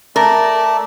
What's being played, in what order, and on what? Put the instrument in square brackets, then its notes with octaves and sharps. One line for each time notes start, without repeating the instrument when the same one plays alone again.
[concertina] A3 D5 A5 [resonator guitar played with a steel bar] A#4